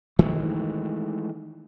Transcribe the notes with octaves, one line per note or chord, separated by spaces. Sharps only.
D#3 E3 G#3 A3